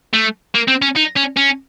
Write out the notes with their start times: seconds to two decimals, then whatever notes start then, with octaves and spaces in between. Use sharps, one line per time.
0.14 A3
0.55 A#3
0.68 C4
0.82 C#4
0.96 D#4
1.16 C#4
1.37 C#4